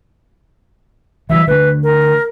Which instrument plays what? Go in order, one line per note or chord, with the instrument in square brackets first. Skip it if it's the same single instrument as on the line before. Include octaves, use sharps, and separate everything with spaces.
[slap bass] E3 F#3 G3 [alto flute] E5
[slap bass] D3 A3 [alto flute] B4
[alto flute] A#4